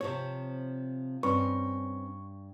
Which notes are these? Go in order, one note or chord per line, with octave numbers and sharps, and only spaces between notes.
C3 F3 C4 C#5
G2 C4 C#4 B4 C#6